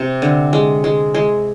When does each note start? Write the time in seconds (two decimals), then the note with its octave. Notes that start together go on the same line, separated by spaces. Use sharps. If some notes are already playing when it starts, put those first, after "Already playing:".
Already playing: C3
0.22 D3
0.53 G#3
0.84 G#3
1.14 G#3